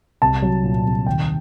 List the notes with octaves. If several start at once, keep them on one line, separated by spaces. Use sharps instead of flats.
C2 A5
F#3
A#2
C2
D#2 G5